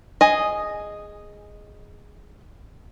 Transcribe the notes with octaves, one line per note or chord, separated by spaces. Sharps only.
G#4 D#5